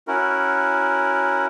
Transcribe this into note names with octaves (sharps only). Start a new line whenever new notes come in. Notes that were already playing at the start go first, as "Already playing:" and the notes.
C#4 E4 F#4 A#4